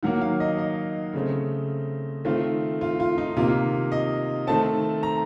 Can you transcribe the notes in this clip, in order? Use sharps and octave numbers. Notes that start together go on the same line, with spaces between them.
D#3 F#3 A#3 F#5
F5
D#5
D#5
C#3 A3 C4
D#3 A3 C4 F4
F4
F4
D#4
C3 D#3 A#3 F4
D#5
D#3 A3 C4 A5
A#5